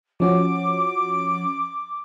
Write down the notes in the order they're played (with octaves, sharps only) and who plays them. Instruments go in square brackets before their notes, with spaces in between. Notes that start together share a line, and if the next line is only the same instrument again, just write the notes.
[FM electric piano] F3 C#4 F#4 [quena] D6